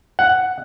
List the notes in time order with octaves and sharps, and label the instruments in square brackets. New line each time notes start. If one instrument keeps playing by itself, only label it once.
[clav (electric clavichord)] F#5